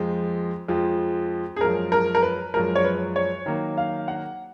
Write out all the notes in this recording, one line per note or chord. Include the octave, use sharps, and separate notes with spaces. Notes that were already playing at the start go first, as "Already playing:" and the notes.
Already playing: F2 F3 G#3
F2 F3 G#3
G#4
F#2 F3 G#3 A#4
A#4
A#4
B4
F#2 F3 G#3 A#4
C#5
B4
C#5
D#3 F#3 A#3
F5
F#5